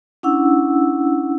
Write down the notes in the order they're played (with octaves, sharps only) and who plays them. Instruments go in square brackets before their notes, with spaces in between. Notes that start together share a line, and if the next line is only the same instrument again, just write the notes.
[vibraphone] C#4 D4 E4 F#5 E6